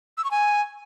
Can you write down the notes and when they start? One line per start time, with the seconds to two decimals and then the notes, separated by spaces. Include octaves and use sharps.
0.18 E6
0.24 C#6
0.31 G#5